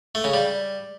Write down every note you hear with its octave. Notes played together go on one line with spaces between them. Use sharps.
A3
C#3
G3